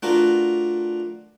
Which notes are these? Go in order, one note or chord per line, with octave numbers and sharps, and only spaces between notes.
A3 D4 F4 F#4 A#4 B4